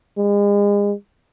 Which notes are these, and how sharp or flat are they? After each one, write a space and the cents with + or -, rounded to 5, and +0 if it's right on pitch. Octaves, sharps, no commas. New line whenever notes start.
G#3 -35